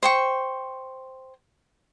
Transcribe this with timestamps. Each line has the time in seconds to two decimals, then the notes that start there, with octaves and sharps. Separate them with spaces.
0.03 C5 G5 C#6